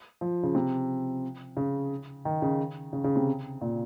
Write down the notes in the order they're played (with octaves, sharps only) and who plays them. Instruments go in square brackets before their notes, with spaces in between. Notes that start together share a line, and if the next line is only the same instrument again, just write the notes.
[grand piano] F3
C#3
C3
C#3
D#3
C#3
C#3
C#3
C3
A#2